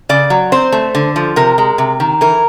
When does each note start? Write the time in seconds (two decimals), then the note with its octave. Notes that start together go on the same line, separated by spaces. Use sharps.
0.09 C#3 D5
0.30 F#3
0.52 C4 C5
0.72 A3
0.95 D3
1.16 F3
1.36 C3 A#4
1.58 G#3
1.78 C3
2.00 D#3
2.21 E3 A#4